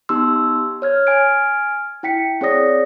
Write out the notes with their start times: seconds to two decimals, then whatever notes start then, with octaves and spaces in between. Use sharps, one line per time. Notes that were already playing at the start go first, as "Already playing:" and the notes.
0.09 B3 D#4 G4 C6 E6
0.82 C#5 F6 G#6
1.07 G#5 F6 G#6 D7
2.03 E4 G5 B6 C#7
2.41 C4 G#4 C#5 D5 D#6 A#6